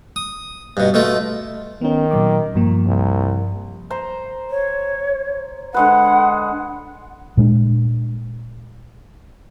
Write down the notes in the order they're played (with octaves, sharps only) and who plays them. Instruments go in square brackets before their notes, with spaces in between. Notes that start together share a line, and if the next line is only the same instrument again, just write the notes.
[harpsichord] D#6
G2 B2
B2 A3 F4
[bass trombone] D#3 [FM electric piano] B3 C#4
[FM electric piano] A#2 F#3 D6
G2 F3 A#3
[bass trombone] C2
[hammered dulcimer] C5 A#5
[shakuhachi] C#5
[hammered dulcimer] D3 G#3 B4 [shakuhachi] F#5
[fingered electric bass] A#2 G#3 D4